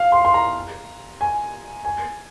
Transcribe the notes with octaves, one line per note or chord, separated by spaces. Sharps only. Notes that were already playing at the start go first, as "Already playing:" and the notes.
Already playing: F5
C6
C6
A#5
G#5
G#5